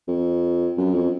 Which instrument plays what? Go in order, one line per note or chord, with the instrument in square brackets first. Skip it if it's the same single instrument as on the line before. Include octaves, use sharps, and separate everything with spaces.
[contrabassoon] F2
F#2
F2